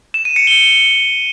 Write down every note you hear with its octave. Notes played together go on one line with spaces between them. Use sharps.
E7
D#7
C#7
G7